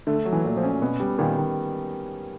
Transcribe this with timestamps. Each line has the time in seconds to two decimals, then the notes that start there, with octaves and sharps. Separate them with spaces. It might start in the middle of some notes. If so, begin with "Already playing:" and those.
0.07 D3 A3
0.25 F#3
0.33 E3
0.45 A#2
0.57 F3
0.63 C#4
0.81 B2 B3
1.00 G3
1.19 A#2 D#3
1.38 D#3